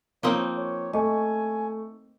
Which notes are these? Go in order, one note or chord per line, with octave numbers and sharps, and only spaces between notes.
F3 A#3 C4 D#4 C#5
C#5
A3 D#5 G#5 C#6